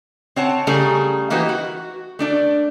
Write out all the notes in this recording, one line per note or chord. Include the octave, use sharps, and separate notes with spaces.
C4 C#5 F#5 A5
C#3 G3 A3 G#4 A#5
E3 A#3 D#4 F#4 G4 B4
F#4
A3 D4 D5